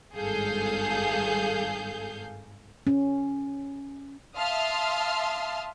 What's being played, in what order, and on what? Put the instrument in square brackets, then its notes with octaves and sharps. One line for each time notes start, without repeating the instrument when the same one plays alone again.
[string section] G#1 G2 G#4 A4 F5 G6
[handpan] C#4
[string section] E5 F5 A5 C6 D#6 F6